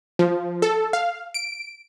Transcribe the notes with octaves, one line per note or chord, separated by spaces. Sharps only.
F3
A4
F5
D7